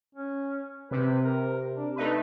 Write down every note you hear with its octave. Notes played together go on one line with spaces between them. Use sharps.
C#4
C3 B4
A#4
D4
A3 D4 D#4 B4